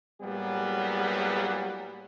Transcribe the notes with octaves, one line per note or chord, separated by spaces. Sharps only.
A2 F#3 G3 A#3 B3 G#4